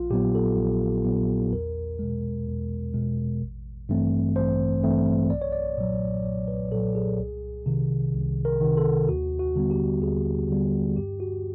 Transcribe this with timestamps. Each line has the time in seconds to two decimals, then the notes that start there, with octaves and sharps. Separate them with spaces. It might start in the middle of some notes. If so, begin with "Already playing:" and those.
Already playing: A#1 F4
0.10 A#2 F#3 B3 G4
0.35 A4
0.57 A#1
1.05 A#2 F#3 B3
1.52 E2 A#4
1.99 B2 G#3
2.46 E2
2.94 B2 G#3
3.42 A1
3.89 G2 E3 A3 C4
4.36 A1 C5
4.83 G2 E3 A3 C4
5.30 B1 D5
5.42 C#5
5.52 D5
5.77 A#2 F#3
6.24 B1 C#5
6.48 B4
6.72 A#2 F#3 A4
6.95 G#4
7.19 C2
7.66 C3 D#3
8.14 C2
8.45 A#4
8.61 C3 D#3
8.77 A4
9.09 D#2 F#4
9.39 F#4
9.56 D3 G3 B3
9.71 G4
10.02 D#2 G#4
10.50 D3 G3 B3
10.96 G2 G4
11.20 F#4